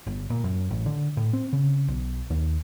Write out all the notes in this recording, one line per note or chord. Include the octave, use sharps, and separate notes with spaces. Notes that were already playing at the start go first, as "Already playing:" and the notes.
G1
A#2
F#2
A1
D3
A2
C4
C#3
B1
D#2